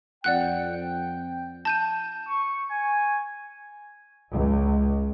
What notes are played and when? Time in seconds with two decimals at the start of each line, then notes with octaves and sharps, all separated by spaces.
0.24 F2 D5 F#5 G5 F#6
1.65 A5 G6 D#7
2.28 C#6
2.71 G#5
4.31 C#2